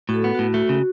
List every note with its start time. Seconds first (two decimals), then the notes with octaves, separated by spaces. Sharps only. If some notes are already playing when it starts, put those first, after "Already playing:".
0.09 A2 F#4
0.14 A4
0.24 B3
0.35 A2 F#4
0.54 A3 F#4
0.69 C#3